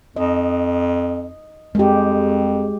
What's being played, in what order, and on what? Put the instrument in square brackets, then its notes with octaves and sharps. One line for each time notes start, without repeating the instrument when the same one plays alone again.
[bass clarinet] F2 [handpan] D#5
[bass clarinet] F2 [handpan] G#3 G4